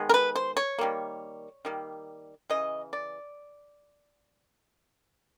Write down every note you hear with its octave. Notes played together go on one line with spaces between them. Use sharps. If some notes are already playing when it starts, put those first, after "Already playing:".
Already playing: D#3 G#3 B3
A#4
B4
C5
C#5
D#3 G3 A#3
D#3 G3 A#3
C#3 E3 D#5
D5